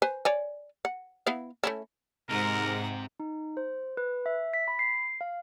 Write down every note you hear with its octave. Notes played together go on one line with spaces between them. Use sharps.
B4 C5 G#5
C#5 D5 G#5
F#5
B3 E4 F5
A3 C#4 E4
G#2 C3 A#4 F#5 A#5
D#4
C5
B4
E5
B6
B5
C7
F5